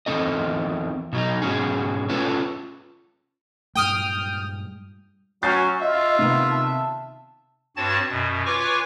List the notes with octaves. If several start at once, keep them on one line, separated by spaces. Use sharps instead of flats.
E2 D#3 G#3 C4 A4 D#5
B2 F#3 D#4
G#2 B2 D#3 F#3 C#4 G#4
C#4 F4 A4 B4 C#5
G2 A#2 G#3 G5 D#6 F6
F#3 C#4 F#4 G6 A6 C7
F4 D#5 E5
C3 D#3 B3 D#4
A5
G2 C4 F#4 C#5 A5 A6
F#2 B2
F4 B4 C#5 G#5 C#6 D6